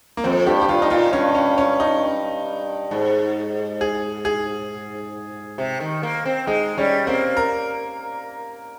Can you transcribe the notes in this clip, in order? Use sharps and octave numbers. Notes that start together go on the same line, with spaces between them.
A#3
F2 C4
G2 G4
G4
G2 F4
D#4
A#2 F4
G2 C#4
C#4
C#4
D#4
G#2
G#4
G#4
C3
D#3
A#3
C4
G#3 D#4
G3 C#4
A#3 C4
A#4